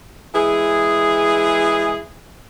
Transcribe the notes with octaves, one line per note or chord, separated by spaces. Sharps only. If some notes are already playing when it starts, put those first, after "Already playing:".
E3 G#3 G#4